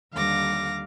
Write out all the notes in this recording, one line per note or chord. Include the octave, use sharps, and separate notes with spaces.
D#2 D3 G3 F5 D6 A#6